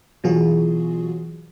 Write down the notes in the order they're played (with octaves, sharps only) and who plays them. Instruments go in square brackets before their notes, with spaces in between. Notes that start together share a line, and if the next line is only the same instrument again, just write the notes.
[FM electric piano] B2 E3 F#3 F4 F#4 G#4